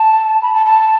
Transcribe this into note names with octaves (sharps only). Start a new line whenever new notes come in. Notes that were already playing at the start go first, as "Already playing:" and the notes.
Already playing: A5
B5
A5
A5